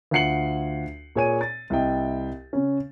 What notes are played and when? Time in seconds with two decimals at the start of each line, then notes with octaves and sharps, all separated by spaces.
0.11 D2 F4 F#5 C7 C#7 F#7
1.16 A#2 G#4 C#5 G#5 D#7
1.41 A6
1.70 C2 E4 D#5 G5
2.53 C#3 C#4